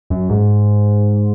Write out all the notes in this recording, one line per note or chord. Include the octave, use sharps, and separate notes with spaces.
F#2
G#2